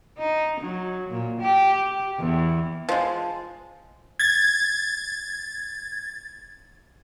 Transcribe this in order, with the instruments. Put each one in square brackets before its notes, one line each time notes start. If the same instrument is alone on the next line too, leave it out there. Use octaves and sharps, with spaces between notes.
[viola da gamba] D#4
F#3
A#2
G4
E2
[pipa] F3 G#3
[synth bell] G#6 A6